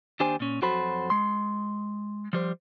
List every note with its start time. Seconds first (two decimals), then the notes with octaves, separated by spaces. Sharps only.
0.20 D#2 D4 G4 C5 G#5
0.40 A#2 C#4
0.62 F2 F#3 F#4 A4 C5 B5
1.10 G#3 C6
2.33 F3 G3 C5